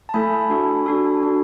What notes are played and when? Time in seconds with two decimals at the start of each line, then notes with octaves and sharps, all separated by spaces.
0.09 A5
0.14 A3 E4 A4 G#5 B5
0.50 D4 F#4 A4
0.86 D4 F#4 A4
1.23 D4 F#4 A4